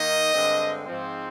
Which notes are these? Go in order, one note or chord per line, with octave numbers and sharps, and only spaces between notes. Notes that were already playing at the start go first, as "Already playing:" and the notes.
Already playing: D#3 A#3 D#4 D#5
G2 D3 G#3 C4
G#2 F3 C4